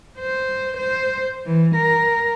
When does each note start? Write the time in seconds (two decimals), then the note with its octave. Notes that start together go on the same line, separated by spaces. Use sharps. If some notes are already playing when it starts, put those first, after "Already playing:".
0.19 C5
0.77 C5
1.46 E3
1.75 A#4